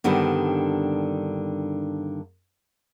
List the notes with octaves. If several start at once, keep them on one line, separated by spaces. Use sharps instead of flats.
G2 D3 D#3 G3 B3 C4